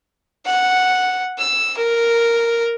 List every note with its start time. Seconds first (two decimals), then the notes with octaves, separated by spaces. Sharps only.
0.46 F#5
1.39 E6
1.77 A#4